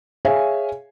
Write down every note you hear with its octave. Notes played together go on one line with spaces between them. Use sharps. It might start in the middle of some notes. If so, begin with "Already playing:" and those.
G#4 C#5 E5 F5 G#5